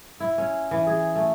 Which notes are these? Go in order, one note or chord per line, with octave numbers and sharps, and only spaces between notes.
E4
C#4
E3
G#4
A3